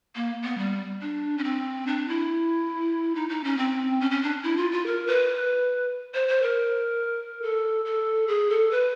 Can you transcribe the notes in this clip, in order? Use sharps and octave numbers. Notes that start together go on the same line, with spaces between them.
A#3
B3
G3
D4
C#4
C4
D4
E4
D#4
D#4
C#4
C4
C#4
C#4
D4
E4
F4
F4
A#4
B4
C5
C5
A#4
A4
A4
G#4
A4
B4